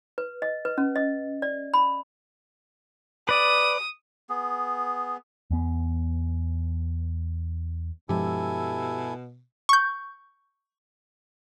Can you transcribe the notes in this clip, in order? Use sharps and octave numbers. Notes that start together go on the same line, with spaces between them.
B4
D#5
B4
C#4
D#5
D5
B5
B4 D5 D#6
B3 G#4
E2 B3
G2 B2 F3 G#3 E4 G4 A4 G#5
C#6 G6